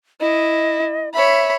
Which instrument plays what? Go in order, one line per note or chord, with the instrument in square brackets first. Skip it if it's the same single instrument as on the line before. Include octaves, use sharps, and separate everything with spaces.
[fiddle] E4 [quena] D#5
[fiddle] C#5 B5 [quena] E5